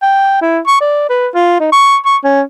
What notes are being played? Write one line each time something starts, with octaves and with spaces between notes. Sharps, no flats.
G5
E4
C#6
D5
B4
F4
D#4
C#6
C#6
C#4